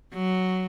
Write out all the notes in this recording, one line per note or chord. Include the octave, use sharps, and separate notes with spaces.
F#3